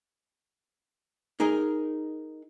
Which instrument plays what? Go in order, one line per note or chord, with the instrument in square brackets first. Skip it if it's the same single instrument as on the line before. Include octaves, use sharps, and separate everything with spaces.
[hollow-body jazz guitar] D#4 G#4 A#4 D#5